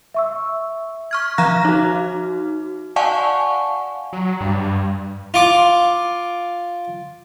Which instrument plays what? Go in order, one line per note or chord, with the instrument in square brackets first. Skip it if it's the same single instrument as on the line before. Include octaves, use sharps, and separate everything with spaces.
[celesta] E5 C#6 E6
[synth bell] C#6 F6 G#6
F3 F5 A#5 F6 F#6 A#6
D#4 F#4
D5 F5 F#5 G#5 A5 C#6
[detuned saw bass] F#3
G2
[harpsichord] F4 D6